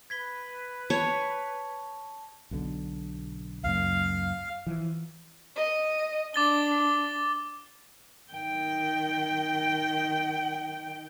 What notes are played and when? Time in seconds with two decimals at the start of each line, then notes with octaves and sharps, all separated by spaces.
0.10 B4 G#6 B6 G7
0.90 C#5 A5 F7
2.51 B1 B2 D3
3.64 C#2 F#2 A#3 F5
4.67 E3 F3
5.56 D#5
6.34 D4 D6 A6 G7
8.32 D#3 G5